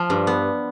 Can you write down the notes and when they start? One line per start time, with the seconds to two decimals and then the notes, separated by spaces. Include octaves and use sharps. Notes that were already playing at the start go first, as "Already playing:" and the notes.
Already playing: F3
0.10 G2
0.27 B3